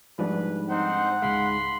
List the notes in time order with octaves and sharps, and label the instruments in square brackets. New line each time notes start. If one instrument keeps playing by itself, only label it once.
[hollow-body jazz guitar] G#2 A3 [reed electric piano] F3 G3 D4 [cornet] B4
[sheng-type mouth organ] C4 D#4 C5 [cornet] F#5
[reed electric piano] C#2 F5 [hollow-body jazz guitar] G#2 G#3 [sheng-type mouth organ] B5 C6